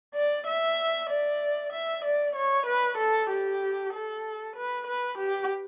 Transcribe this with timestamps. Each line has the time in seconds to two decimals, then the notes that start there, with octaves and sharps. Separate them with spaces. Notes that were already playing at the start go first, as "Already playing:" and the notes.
0.16 D5
0.47 E5
1.10 D5
1.73 E5
2.05 D5
2.36 C#5
2.66 B4
2.98 A4
3.30 G4
3.93 A4
4.56 B4
4.87 B4
5.18 G4